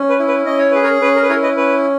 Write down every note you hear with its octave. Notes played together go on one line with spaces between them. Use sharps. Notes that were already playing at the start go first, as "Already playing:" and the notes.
Already playing: C#4
B4
E4
B4
C#4 D#5
C#5
G#4 B4
A#4 C#5
C#4 B4
A#4
B4
E4 A#4 C#5
B4 D#5
C#4 B4